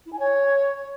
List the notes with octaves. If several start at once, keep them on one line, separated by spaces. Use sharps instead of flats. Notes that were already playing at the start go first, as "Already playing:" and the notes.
E4
G#5
C#5